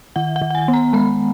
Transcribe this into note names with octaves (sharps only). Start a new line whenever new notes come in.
D#3 F#5
F#5
D#3
F#5
G#5
B3
A#5
G#3 B5